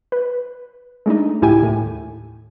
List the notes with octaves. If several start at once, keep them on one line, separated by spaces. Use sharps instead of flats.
B4
G#3 A3 D4 D#4
C#2 A2 E4 G4 G5 G#5
D#2 A2